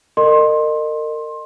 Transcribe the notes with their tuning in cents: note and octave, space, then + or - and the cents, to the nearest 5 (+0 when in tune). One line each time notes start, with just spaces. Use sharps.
A#4 -35 D#5 -30 C6 +20